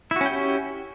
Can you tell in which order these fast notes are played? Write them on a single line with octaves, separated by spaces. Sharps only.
E4 F#4 C#4 G5 G4